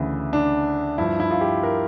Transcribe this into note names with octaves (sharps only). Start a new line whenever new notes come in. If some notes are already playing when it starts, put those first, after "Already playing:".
Already playing: D2 C#3 E3
D4
G2 F3 E4
E4
F4
G4
A#4